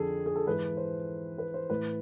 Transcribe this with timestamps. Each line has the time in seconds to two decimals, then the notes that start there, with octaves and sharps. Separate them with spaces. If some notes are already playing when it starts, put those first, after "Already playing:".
Already playing: F2 D3 F3 G#4 A4
0.26 G#4
0.36 A4
0.47 G#2 E3 B4
0.77 C5
1.38 B4
1.54 C5
1.70 A2 E3 B4